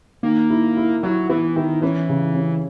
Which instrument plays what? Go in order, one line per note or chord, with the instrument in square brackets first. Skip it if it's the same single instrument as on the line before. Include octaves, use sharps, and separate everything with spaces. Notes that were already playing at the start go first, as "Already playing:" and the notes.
[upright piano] D#3 [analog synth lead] A#3
[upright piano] E4
E4
[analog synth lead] F#3 [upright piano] E4
[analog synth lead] E3 [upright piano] B3
[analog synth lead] D#3 [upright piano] E4
[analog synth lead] E3 [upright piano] C#4
[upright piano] C#3
C#4